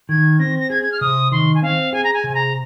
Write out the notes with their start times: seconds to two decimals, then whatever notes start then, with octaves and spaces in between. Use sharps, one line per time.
0.09 D#3 G#6
0.39 C4 A#6
0.59 A#6
0.70 G#4 G#6
0.84 G#6
0.92 F6
1.01 C3 D#6
1.32 D#3 C6
1.55 G#5
1.62 C4 F5
1.93 G#4 G#5
2.04 A#5
2.14 G#5
2.24 C3
2.30 G#5
2.35 A#5